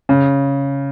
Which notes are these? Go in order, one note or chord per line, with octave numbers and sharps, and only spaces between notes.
C#3